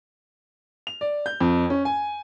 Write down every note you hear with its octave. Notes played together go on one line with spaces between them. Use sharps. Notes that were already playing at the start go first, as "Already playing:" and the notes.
F7
D5
G6
F2
C#4
G#5